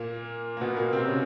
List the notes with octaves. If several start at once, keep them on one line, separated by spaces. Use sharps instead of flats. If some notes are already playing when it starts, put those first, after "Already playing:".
Already playing: A#2 A#3
A#3
B2 B3
A#2 A#3
C3 C4
C#3 C#4